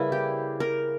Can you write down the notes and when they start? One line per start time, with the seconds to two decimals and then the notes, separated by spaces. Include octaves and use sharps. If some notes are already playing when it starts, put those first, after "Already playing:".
Already playing: C#3 G3 A#3 E4 B4
0.12 G4
0.60 A#4